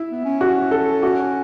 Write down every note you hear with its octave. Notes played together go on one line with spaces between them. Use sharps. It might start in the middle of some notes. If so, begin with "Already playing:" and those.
Already playing: E4
B3
C#4
F#4
A4
F#4